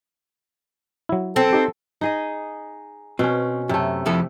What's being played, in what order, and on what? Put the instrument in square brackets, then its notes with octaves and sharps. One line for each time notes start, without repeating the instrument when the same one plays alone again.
[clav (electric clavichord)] F#3 E4
[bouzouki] C4 [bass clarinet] A4
[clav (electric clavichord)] D#4 G4
[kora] D#4 G#4 D#5
[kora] B2 C#4 [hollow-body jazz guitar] C4
[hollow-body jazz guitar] F#2 [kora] C3 A3
[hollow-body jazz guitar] F2 E4 A4